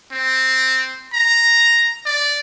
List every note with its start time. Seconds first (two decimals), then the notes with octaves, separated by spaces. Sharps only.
0.11 C4
1.13 A#5
2.06 D5